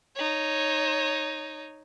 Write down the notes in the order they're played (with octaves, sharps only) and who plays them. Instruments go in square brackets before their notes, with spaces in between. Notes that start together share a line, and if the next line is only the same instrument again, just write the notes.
[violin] D#4 C#5